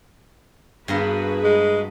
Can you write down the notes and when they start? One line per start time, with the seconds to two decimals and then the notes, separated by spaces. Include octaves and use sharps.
0.88 G2 A#3 B3 F#4 G#4 B4
1.44 G#3